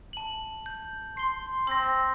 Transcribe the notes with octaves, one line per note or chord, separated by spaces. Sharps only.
A5 F#7
G6
C6 C7 G7
C4 C6 A#6